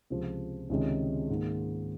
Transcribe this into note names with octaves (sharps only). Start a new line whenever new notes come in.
C#2 C3 F3
C#2 C3 D#3 G#3 C#4
G#2 D#3 A#3